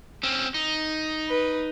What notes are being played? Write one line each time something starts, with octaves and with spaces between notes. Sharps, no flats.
C4 C#4
D#4
B4